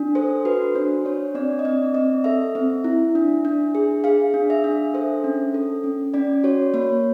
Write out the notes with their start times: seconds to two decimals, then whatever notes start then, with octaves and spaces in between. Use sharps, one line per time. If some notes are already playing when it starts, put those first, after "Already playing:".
Already playing: D4
0.15 A4 C5
0.45 F#4 B4
0.75 D4 C5
1.05 D4 C#5
1.35 C4 D5
1.59 D#5
1.65 C4 D5
1.94 C4 D#5
2.24 A4 E5
2.55 C4
2.84 E4
3.15 D4
3.45 D4
3.75 G#4
4.04 G#4 F5
4.34 D4
4.50 E5
4.64 D4
4.94 A4 C5
5.24 C#4
5.54 A4
5.84 C#4
6.14 C#4 D5
6.44 F#4 C#5
6.74 A#3 C#5